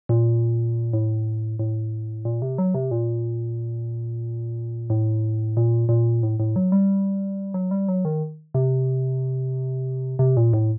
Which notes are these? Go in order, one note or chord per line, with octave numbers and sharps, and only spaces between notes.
A#2
A2
A2
A#2
C3
F#3
C3
A#2
A2
A#2
A#2
A2
A2
F#3
G3
F#3
G3
F#3
D#3
C3
C3
A#2
A2